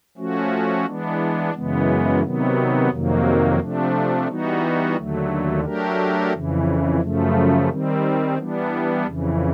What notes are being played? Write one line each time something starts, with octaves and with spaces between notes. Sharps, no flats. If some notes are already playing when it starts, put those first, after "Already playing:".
F3 A3 C#4 F#4
E3 G#3 B3 D4
F#2 C#3 E3 G#3 B3
C3 D#3 F#3 B3
F2 C3 D#3 F#3 A#3
C3 F3 A3 D4
E3 G3 B3 D#4 F#4
D#2 D3 F#3 A3
F#3 A3 D4 G4 A#4
F2 C#3 E3
F#2 C#3 F3 A3
D#3 G3 C4
E3 G3 B3 D4
F2 C#3 E3